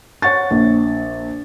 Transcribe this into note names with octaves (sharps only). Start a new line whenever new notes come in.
C#5 F#5 C#6 A6
A#1